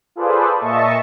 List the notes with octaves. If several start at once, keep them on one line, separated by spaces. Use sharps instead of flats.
F4 G#4 A4 B4 C5 D5
A#2 D#5 E5 A5 C#6